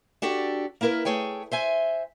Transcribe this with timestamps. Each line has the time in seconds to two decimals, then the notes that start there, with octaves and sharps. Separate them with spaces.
0.22 D4 F#4 G4 A4 D5
0.81 A#3 B3 E4 A#4 B4
1.05 A3 G#4 C#5 G5
1.52 C5 E5 G#5